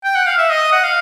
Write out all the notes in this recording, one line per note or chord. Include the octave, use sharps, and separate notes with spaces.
G5
F#5
F5
E5
D#5
F#5
F5